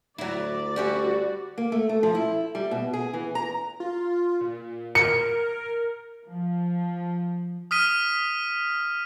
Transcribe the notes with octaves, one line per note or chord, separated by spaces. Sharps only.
D2 F#3 E4 D5
G3 C#4 E4 F#4
A#3
A3
A3
F3
E4
G3
B2
G#4
E3
A#5
F4
A#2
A#4 C#7
F3
D#6 F6 B6 D#7